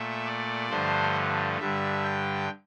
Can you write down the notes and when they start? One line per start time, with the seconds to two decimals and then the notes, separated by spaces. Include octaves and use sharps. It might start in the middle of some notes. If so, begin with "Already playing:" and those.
Already playing: A#2 A3 E5
0.26 D5
0.70 G2 D3 F3 A3 C5
1.60 G2 D3 G3 E5
2.04 G5